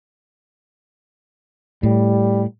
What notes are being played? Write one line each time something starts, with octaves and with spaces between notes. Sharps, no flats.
A2 G3